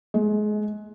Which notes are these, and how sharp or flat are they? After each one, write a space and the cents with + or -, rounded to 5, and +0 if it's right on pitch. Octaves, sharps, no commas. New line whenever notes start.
G#3 +25